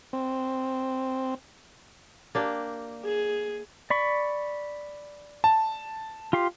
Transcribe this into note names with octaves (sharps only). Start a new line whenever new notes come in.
C4
A#3 D4 G4
G#4
D5 B5 C#6
A5
F4 G4 C6